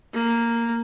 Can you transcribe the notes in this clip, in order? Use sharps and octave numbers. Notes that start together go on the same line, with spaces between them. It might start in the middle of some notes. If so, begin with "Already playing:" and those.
A#3